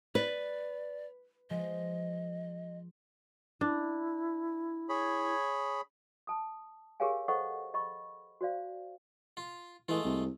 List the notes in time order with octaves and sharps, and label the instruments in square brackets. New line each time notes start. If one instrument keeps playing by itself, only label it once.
[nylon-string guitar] B4 [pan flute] D5
[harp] F3 G#3 C5 [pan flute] D#5
[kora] D4 [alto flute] E4
[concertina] G#4 C#5 B5
[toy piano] A5 D#6
G4 G#4 A#4 C#5 F5 G#5
A4 C5 D#5 F#5 C#6 E6
D#5 B5 C#6
F#4 C5 D5 F5
[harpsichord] F4
[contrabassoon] E3 [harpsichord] G#3 A3 F4
[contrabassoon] C2